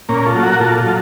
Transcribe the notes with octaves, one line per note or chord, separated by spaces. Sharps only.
A#2 A#3 C#4
F4 A4
F#3
F#4 A#4
A#2 F4 A4
F4 A4
F#3